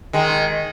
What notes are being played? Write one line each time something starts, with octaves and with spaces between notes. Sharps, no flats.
D#3 G#3